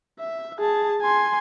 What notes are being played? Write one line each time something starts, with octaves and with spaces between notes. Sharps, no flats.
E5
G#4 A5
G#5 C6